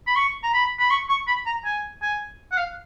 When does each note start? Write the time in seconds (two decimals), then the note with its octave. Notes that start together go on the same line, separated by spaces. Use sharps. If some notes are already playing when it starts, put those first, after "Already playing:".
0.07 B5
0.16 C#6
0.43 A#5
0.54 B5
0.79 B5
0.90 C#6
1.09 C#6
1.28 B5
1.47 A#5
1.65 G#5
2.02 G#5
2.52 F#5
2.57 F5